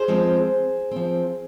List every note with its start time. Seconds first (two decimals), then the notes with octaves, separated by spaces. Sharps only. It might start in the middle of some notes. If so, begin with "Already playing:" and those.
Already playing: G#4 C5
0.08 F3 G#3 C4
0.91 F3 C4